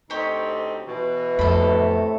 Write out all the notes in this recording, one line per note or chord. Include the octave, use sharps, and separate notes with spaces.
D2 C4 D#4 G4 C#5
B2 E3
F2 A2 C3 A3 A4 B5